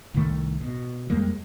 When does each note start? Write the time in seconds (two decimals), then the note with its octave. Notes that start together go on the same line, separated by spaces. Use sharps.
0.14 C2 A2 D#3 A3
0.61 B2
1.10 F2 G3 G#3 A#3